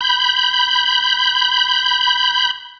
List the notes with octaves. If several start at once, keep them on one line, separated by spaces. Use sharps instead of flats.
B5 G6